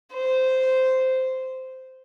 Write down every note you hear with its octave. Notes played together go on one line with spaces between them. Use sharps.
C5